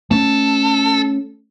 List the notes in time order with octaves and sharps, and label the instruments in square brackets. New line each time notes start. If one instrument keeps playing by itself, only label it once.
[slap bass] A3 C#4 [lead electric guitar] A4